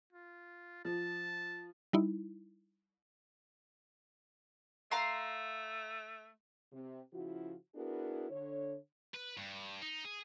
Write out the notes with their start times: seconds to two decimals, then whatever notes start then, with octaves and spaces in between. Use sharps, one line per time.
0.13 F4
0.85 F3 A5
1.93 G3 D#4 E4
4.91 A3 F5 A#5 C6
6.73 C3
7.13 C#3 F3 E4 F#4
7.75 B3 D4 E4 F#4 G#4 A#4
8.30 D3 C#5
9.14 B4
9.37 G2
9.82 D#4
10.05 G#4